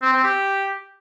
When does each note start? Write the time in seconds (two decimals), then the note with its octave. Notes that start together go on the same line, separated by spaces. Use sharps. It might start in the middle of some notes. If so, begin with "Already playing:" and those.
0.02 C4
0.13 C4
0.24 G4